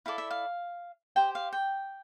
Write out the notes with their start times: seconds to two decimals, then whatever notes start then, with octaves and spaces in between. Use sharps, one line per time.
0.06 E4 A4 D5 F5
0.18 E5
0.31 F5
1.16 G4 C5 G5
1.35 F5
1.53 G5